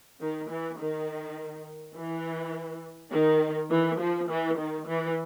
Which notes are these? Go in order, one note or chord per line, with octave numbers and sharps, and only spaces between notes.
D#3
E3
D#3
E3
D#3
E3
F3
E3
D#3
E3